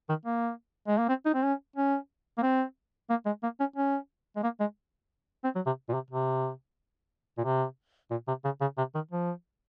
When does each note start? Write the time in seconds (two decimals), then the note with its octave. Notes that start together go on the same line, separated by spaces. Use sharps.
0.09 D#3
0.25 A#3
0.87 G#3
0.98 A#3
1.09 C4
1.25 D#4
1.34 C4
1.43 C#4
1.76 C#4
2.38 A#3
2.43 C4
3.10 A#3
3.26 G#3
3.43 A#3
3.60 C#4
3.76 C#4
4.36 G#3
4.43 A#3
4.60 G#3
5.44 C4
5.55 F#3
5.66 C3
5.89 A#2
5.93 C3
6.10 C3
7.38 A#2
7.44 C3
8.11 A#2
8.28 C3
8.44 C#3
8.61 C#3
8.77 C3
8.95 D#3
9.11 F3